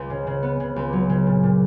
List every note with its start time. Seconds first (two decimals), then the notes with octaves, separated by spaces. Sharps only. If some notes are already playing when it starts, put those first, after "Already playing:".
Already playing: C#2
0.10 C#3
0.27 C#3
0.43 B3
0.60 C#3
0.76 C#2
0.93 F#3
1.10 C#3
1.27 A#2
1.43 A#2